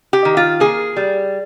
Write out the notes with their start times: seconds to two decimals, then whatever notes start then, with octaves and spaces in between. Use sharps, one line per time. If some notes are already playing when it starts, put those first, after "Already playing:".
0.13 G4
0.25 D#3
0.37 F4
0.60 A#3 G#4
0.97 G3